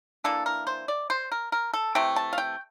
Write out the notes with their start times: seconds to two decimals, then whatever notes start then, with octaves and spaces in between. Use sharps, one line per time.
0.24 E3 A#3 D4 A4
0.46 A#4
0.67 C5
0.88 D5
1.10 C5
1.32 A#4
1.52 A#4
1.74 A4
1.95 C3 E3 A3 G5
2.16 A5
2.33 F5
2.38 G5